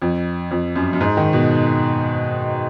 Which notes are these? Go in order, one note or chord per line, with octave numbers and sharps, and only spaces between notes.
F2
F2
F#2
F#2
G#2
D#3
B2